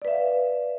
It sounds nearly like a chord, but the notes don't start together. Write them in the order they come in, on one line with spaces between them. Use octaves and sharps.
D5 B4 E5 F5